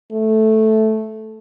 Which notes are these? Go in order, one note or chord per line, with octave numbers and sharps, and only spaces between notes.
A3